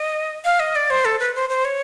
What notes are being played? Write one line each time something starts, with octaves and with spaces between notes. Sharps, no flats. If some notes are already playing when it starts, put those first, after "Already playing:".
Already playing: D#5
F5
D#5
D5
C5
A4
B4
C5
C5
C#5